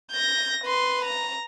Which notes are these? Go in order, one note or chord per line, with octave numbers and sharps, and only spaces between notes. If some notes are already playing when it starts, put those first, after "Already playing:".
G6 A#6
B4 C6
A#5